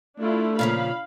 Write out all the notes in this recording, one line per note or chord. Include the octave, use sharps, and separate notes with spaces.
A3 D4 E4 F4
A#2 C#3 F3 F5 B5